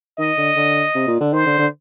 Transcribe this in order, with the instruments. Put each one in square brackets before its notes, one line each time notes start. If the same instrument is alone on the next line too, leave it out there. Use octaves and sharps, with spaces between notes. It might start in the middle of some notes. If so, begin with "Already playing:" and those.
[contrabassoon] D#3 [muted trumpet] D#5
[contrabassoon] D3
D3
C3
A#2
D3
[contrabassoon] D#3 [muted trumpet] C5
[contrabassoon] D3
D3